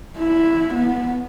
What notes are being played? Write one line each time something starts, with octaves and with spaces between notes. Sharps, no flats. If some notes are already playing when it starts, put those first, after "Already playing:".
E4
B3